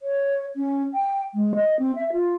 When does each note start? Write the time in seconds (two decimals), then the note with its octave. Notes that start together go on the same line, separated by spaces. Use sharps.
0.01 C#5
0.56 C#4
0.94 G5
1.35 G#3
1.55 D#5
1.79 C4
1.96 E5
2.13 F4